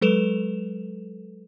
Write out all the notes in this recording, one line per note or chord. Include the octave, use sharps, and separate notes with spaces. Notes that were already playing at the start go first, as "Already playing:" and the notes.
F#3 G#3 A4 B4 E7 F7